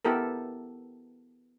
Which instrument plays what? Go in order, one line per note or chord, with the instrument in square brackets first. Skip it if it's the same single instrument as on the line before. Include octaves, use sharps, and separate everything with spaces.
[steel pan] B3 E4 G4 A4 A#4